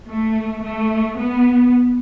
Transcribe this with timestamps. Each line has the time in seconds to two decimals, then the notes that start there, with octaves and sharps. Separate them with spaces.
0.10 A3
0.64 A3
1.18 B3